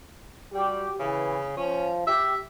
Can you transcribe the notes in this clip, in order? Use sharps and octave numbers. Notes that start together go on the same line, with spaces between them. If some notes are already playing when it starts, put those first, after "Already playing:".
G3 F#4 G4
C#3 E3
F3 C#4
G4 E5